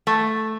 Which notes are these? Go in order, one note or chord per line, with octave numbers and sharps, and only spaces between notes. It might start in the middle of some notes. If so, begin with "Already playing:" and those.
A3